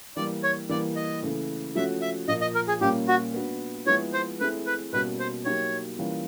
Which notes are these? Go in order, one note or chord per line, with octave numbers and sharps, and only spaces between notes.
E3 G3 A#3 D5
C#5
E3 G3 A#3 D5
D#5
C#3 E3 A3
F3 A3 C#4 F#4 E5
E5
A#2 F3 A#3 D#5
D#5
A#4
G#4
A#2 G3 A#3 C#4 F4 G4
F#4
B3 D4 F#4
F3 G#3 B3 E4 G#4 C#5
C5
A3 C4 E4 G#4 B4
B4
B2 G3 A#3 C#4 F#4 B4
C5
F#3 A#3 D#4 G4 C#5
E3 G3 A#3 C#4 F4